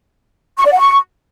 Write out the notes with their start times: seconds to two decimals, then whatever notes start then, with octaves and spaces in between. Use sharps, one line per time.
0.58 C#6
0.65 D5
0.72 F#5
0.79 C#6